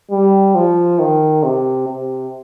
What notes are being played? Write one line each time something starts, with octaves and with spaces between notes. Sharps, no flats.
G3
F3
D#3
C3
C3